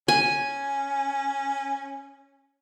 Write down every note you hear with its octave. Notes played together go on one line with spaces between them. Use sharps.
C#4 G#5